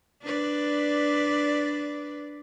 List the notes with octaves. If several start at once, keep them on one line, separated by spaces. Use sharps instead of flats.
D4 B4 D5